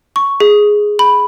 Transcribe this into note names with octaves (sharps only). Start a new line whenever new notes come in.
C#6
G#4
B5